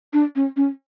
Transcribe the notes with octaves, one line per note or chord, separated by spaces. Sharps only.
D4
C#4
C#4